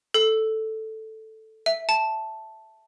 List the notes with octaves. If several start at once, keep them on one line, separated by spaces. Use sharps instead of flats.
A4
E5
A5